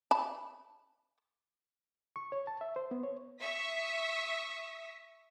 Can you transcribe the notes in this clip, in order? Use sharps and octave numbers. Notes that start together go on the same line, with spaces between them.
A5 B5
C#6
C#5
A5
E5
C5
B3
C#5
E5 C#6 D#6 B6